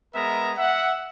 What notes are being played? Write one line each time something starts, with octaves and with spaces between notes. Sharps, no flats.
G#3 B3 A#4 E5 A#5
E5 F#5